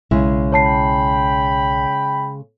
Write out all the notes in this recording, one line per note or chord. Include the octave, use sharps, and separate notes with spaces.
B1 C#3 G#3 E4
C#5 G5 A5 B5 C7